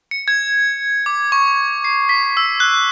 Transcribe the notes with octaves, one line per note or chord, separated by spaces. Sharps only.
C#7
G#6
D6
C#6
C7
B6
E6
F#6